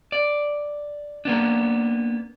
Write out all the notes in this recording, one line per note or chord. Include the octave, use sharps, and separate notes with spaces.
D5
A#3 B3 D4